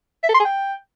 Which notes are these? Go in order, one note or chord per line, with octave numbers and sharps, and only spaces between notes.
E5
A4
C6
G#4
G5